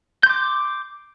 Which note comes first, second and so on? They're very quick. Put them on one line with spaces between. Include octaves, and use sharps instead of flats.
G6 C6 D6